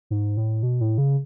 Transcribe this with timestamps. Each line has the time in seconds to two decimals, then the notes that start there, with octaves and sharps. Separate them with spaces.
0.10 G#2
0.37 A2
0.63 B2
0.81 A2
0.98 C#3